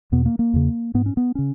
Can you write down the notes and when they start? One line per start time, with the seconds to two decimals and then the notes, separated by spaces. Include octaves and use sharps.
0.12 E2 B2 B3
0.26 A#3
0.39 A#3
0.54 E2 C#3
0.94 G#2 B3
1.06 C#4
1.17 B3
1.35 C#3 C#4